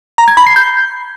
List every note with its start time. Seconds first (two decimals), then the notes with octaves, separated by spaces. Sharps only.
0.18 A#5
0.28 G#6
0.37 B5
0.47 C7
0.56 G6